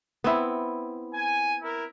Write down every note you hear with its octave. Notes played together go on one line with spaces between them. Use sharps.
B3 C4 E4
G#5
E4 A#4